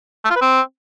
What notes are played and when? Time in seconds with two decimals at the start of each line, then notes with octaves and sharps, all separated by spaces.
0.25 A3
0.30 F4
0.36 B4
0.42 C4